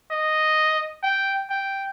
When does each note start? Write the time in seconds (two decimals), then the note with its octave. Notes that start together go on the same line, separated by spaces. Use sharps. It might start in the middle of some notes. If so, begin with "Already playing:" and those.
0.11 D#5
1.03 G5
1.50 G5